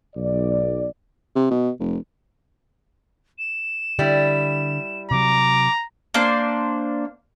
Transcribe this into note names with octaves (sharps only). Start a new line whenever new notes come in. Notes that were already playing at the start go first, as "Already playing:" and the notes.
B1 D5
C3
B2
F1
E7
D3 G3 E4
C3 F#3 A#5 D6
A#3 D4 C5 C6